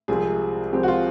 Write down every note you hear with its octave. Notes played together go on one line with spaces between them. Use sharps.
C2 C3 F3 G#3 C4 G#4
C2 C3 F3 G#3 C4 G4
F#4
F4